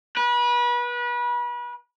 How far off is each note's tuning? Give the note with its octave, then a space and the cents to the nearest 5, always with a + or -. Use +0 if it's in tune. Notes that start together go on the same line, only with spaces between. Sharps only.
B4 -30